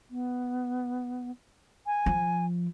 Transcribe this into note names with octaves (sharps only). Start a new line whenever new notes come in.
B3
G#5
F3